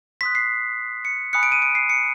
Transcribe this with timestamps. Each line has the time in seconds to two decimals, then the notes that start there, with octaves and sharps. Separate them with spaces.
0.21 C6 D#6 F#6 B6
0.35 C7
1.05 C#7
1.33 G#5 B5 D#6 F#6 C#7
1.43 D7
1.52 D#7
1.62 D7
1.75 C7
1.90 C#7